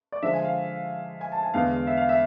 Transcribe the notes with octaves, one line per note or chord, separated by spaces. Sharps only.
D5
D3 F3 G#3 E5
G#5
F5
G#5
A5
G#5
E2 D3 G#3 F5
E5
F5
E5